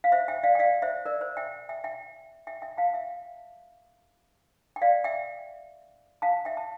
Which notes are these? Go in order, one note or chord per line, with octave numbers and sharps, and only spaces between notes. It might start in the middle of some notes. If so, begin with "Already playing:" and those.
F5
C5 E5
E5 G5
D5 F5
G5
D5 F5
C5 E5
A#4 D5
C5
E5 G5
E5 G5
E5 G5
E5 G5
E5 G5
F5 A5
F5
E5 G5
G5
D5 F5
E5 G5
F5 A5
E5 G5
A5